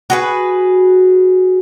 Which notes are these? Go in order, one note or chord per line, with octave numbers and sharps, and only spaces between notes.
F#4 G#4 B4